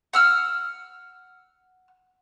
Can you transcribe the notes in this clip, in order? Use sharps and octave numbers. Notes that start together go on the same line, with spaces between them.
F#5 E6 F6